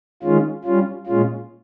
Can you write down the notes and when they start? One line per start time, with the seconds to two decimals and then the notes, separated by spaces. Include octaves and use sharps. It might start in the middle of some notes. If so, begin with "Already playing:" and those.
0.23 D#3 G#3 C#4 F4
0.64 G3 C#4 F4
1.07 A#2 G#3 C#4 F4